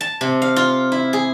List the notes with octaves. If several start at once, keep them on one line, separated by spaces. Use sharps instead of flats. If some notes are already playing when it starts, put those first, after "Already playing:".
A5
C3
F5
F4
E4
G#4